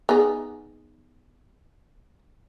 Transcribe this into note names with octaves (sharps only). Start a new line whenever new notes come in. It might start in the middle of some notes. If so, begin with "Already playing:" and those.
B3 D#4 G#4